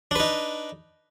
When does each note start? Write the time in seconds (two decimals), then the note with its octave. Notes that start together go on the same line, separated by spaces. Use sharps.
0.11 D4
0.16 B4
0.20 D#4